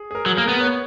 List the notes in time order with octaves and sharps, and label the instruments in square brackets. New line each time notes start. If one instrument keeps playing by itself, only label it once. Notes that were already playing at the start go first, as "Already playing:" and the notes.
Already playing: [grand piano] G#4
G#4
A#4
[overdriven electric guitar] F#3
[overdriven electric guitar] A#3 [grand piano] A#4
[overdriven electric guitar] B3
[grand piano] C#5